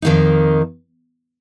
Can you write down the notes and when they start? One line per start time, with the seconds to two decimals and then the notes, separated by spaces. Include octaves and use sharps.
0.02 F2 D#3 A#3 D#4